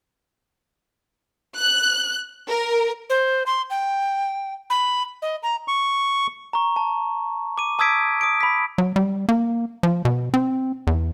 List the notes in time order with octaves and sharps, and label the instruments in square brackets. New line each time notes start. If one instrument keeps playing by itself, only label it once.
[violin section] F#6
A#4
[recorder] C5
C6
G5
B5
D#5
A#5
[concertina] C#6
[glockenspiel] A#5 C#6
A5
D6 D#7
A5 D#6 E6 G#6 B6 D7
D#6 D7
B5 B6
[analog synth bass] F#3
G3
A#3
F3
B2
C4
E2